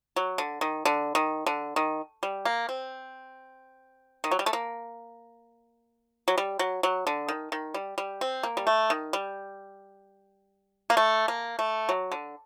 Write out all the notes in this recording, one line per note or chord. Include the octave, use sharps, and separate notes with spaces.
F#3
D3
D#3
D3
D#3
D3
D#3
G3
A#3
C4
D#3
F#3
G3
A3
A#3
F#3
G3
F#3
F#3
D3
D#3
D#3
G3
G3
C4
A#3
G3
A3
D#3
G3
A#3
A3
A#3
A3
F#3
D3